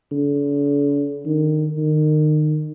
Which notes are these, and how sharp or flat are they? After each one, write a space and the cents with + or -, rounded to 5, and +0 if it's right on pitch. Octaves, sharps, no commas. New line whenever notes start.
D3 -45
D#3 -15
D#3 -30